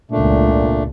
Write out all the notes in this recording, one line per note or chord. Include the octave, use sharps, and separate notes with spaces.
G#1 C#2 A#2 A3 D4